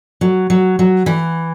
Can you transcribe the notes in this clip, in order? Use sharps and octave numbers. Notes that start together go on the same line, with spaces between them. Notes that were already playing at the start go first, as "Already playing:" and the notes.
F#3
F#3
F#3
E3